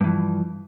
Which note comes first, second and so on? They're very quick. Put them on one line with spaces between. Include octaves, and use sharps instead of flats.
G2 E3 F3